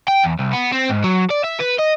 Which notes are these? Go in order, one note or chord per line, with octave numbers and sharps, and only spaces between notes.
G5
E2
C2
B3
C4
G#2
F#3
D5
E5
B4
D#5